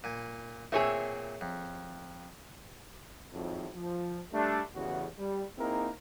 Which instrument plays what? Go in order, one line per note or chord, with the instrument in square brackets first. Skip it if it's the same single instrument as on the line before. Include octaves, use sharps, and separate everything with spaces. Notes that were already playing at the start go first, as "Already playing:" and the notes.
[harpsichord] A#2 G#5
[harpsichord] A#2 A3 C4 [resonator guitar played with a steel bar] G#4 C#5 E5
[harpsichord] F2
[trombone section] G#1 F2 A2
F3
G3 A3 D4
A1 E2 C#3 F#4
G3
A#3 C4 D#4 E4 G#4 A#4